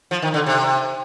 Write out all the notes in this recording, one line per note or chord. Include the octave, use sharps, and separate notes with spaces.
F3
D#3
D3
C3